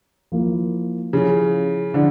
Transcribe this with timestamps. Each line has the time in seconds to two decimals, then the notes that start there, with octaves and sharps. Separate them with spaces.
0.32 F3 A#3 E4
1.13 C#3 F3 C#4 E4
1.94 D3 F3 C#4 E4